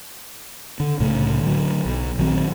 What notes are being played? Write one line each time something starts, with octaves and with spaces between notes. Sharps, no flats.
D3
C2 A2 C#3 A3
D3 E3 F#3
B1
A#1 D#3 F#3 C4